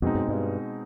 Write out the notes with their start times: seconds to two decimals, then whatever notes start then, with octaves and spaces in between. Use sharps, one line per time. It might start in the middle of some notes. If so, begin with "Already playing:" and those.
0.02 F2 B2 G#3 C4 D#4
0.15 F#2
0.28 G2